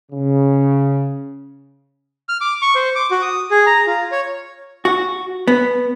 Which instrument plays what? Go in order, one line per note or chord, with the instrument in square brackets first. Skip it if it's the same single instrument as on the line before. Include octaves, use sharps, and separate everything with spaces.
[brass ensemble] C#3
[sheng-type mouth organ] F6
D6
C#6
C5
D6
F#4
D#6
G#4
A#5
F4
C#5
[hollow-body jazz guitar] F#4
B3